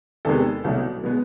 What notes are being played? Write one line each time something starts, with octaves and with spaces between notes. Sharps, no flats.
E2 C3 D#3 G#3 B3 A4
C2 B2 F#3 A3
B2 G#3 B3